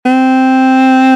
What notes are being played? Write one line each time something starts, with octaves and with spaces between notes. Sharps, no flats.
C4